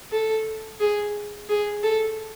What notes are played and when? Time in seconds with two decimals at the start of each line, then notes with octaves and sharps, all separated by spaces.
0.12 A4
0.80 G#4
1.49 G#4
1.83 A4